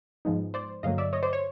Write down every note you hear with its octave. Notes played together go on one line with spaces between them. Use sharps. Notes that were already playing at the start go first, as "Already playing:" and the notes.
G#2 F3 G#3 B3 D#4
C5 D5
G2 D3 F#3 A#3 D#5 F5
D5 E5
C#5 D#5
C5 D5
C#5